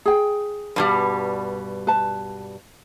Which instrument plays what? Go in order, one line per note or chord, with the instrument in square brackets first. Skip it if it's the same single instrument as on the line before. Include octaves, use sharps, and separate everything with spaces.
[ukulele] G#4 G5
[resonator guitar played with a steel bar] G2 B2 G3
[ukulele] B4 A5